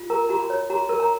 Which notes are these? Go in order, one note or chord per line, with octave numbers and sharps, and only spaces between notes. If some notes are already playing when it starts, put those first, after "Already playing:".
Already playing: F4
A#4 A#5
F#4 A#5
B5
C#5
F#4 A#5
A#4
A#5